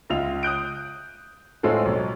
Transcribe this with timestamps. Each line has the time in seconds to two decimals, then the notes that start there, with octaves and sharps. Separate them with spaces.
0.10 C#2 F4 E5 F7
0.43 D#6 F#6 G6 D7
1.63 A2 G#3 C4 F4 A4
1.85 B1